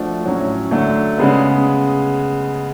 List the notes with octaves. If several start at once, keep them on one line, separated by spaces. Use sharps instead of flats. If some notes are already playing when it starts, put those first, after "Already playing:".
Already playing: F3 A3 D4 F#4
A2 F#3 C#4
D3 F#3 A3 D4
C#3 G#3 B3